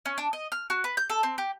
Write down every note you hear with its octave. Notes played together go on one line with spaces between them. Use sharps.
C#4
D4
D#5
F6
F#4
B4
G6
A4
C4
G4